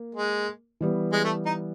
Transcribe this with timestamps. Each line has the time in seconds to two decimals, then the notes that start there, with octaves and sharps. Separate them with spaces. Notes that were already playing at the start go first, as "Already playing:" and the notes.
Already playing: A#3
0.15 G#3
0.81 E3 G3 B3
1.13 G#3
1.24 A3
1.46 D#4